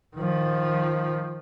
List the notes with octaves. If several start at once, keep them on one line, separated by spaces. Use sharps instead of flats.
D#3 F3